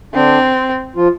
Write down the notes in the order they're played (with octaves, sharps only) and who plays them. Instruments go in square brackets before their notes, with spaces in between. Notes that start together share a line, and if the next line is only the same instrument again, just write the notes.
[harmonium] D3 D4 [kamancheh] C4
[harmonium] F3 F4